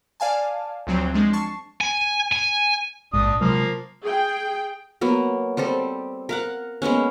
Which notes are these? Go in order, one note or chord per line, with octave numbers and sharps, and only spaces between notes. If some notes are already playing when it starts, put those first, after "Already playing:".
D5 F5 G#5 A5
D2 F3 F#3 C4
F3 G#3 D4
A5 C#6 C7
G#5
G#5
A#1 G#2 D4 D#6
C3 F3 F#3 G#3 A#3
G#4 G5
F#3 A#3 B3
G3 C4 G4 A4
A#4 F5 F#5
G#3 A#3 B3 C#4